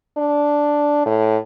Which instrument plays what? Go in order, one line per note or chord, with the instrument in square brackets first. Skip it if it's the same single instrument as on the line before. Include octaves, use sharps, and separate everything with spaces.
[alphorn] D4
A2